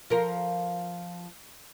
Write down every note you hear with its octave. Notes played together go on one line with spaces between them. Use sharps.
F3 A#4